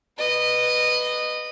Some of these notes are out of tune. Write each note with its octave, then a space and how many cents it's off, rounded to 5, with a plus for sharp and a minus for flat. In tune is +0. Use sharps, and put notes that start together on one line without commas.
B4 +0 D#5 -15